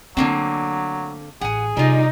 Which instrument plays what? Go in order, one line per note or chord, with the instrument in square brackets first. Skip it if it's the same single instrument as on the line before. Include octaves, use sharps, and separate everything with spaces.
[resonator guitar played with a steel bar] D3 A#3 C4 [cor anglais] F#3 [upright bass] A3
[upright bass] A1 [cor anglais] G#4 [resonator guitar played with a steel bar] F#5 G#5
[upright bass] C3 [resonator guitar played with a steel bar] G3 F4 [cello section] D#4